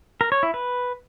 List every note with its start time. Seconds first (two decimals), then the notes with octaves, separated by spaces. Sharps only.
0.21 A#4
0.32 C#5
0.43 E4
0.54 B4